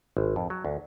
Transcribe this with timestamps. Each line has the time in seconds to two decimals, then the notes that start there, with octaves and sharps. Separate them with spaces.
0.17 G#1
0.36 F2
0.50 F#3
0.65 D2